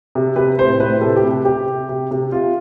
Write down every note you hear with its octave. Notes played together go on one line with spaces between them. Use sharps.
C3
C3 B4
A2 C5
A2 B4
C3 A4
G4
C3
G4
C3 G4
C3
C3
C3
C3 F4